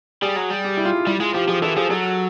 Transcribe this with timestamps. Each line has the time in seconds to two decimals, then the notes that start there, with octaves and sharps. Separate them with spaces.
0.22 G3 G#4
0.36 F#3
0.50 G3
0.64 G4
0.77 E4
0.85 F4
1.06 G3 E4
1.20 G#3 F4
1.34 F3 G4
1.48 F3 G#4
1.62 E3 A4
1.76 F3 G#4
1.90 F#3 A4